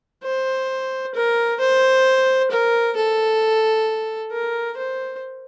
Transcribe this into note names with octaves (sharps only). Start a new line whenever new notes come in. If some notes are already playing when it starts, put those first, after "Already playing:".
C5
A#4
C5
A#4
A4
A#4
C5